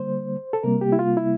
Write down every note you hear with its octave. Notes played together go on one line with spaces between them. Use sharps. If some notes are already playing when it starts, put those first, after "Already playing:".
Already playing: D3 G3 A#3 C5
A4
C3 G3 A#3 A#4
G4
E4
F4
E4